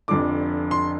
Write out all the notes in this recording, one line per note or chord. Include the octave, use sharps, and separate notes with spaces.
F1 F2 D3 D6
C6